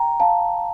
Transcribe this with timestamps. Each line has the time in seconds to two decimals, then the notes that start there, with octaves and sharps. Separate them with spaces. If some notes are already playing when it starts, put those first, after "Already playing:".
Already playing: G5 A#5
0.20 F5 A5